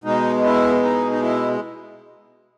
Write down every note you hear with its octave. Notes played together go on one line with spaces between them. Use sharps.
B2 G#3 D#4
E4
D#4
D#4
E4